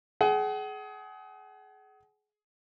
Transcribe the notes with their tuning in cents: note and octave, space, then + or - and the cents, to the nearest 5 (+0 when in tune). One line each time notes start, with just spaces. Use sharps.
G#4 +25 F#5 +40